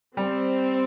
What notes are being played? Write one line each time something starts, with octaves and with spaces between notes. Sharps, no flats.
G3 C4